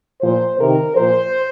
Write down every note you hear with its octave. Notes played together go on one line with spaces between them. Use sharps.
A#2 F3 C5
C3 D#3 A#4
A#2 F3 C5